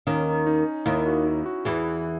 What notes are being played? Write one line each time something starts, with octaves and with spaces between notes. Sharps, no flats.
D#2 D#3 C#4
D#4
D#2 D#3 E4
F#4
E4
F#4
E2 E3 G#4